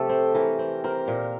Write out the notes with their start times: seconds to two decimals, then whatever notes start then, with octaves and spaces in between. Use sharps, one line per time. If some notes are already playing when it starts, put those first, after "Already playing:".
Already playing: C3 F3 A3 G4 A4
0.09 C4
0.34 E3 A#4
0.59 C4
0.84 C4 A#4
1.08 A#2